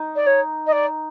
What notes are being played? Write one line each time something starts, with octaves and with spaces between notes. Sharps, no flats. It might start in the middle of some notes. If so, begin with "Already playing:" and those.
Already playing: D#4
D5
C#5
D#5
D5